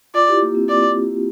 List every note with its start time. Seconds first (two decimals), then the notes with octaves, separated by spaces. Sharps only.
0.14 F4 D5
0.28 E4 G4
0.42 A#3
0.55 C4
0.69 D5